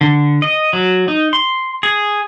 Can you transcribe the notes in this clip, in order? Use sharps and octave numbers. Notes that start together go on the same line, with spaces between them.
D3
D#5
F#3
D#4
C6
G#4